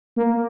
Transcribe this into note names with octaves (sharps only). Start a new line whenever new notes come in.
A#3